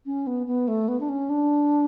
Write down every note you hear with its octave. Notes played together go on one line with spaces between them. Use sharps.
C#4
B3
B3
A3
B3
D4
C#4
D4